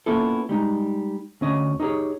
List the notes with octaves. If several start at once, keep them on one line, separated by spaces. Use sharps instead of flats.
A#3 B3 C#4 E4 F4 A4
G3 G#3 D#4
D2 C#4 D#5
D#4 G4 G#4 C#5